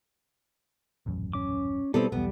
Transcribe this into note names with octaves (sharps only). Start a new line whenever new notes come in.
D#1 A1 F#2
C#4 D6
B2 G3 B3 C4 E4 A4
B1 E2 G3 B3